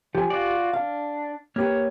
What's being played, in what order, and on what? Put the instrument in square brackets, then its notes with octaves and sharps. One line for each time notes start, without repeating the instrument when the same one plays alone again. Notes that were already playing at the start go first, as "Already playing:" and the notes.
[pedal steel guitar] F3 [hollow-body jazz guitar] G4 G#5
[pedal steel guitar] F4 F#4 D5
[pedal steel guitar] D4 [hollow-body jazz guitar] F5
[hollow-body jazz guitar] A#3 G4 B4 [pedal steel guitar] C#5 F6